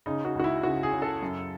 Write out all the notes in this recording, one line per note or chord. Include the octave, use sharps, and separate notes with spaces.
C#3 D#4
F#4
C#2 F#4
E4
C#3 F#4
G#4
C#3
A4
F#2